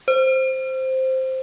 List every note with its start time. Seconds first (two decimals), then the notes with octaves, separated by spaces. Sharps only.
0.08 C5